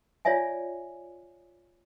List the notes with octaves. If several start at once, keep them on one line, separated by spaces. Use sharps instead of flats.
F4 C#5 D5 E5 G#5